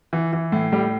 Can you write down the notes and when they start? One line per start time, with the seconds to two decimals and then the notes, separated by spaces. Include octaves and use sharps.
0.13 E3
0.33 E3
0.52 A2
0.72 A2 G3